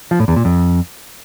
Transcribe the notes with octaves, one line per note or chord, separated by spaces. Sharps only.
F3
A2
E2
A#2
F2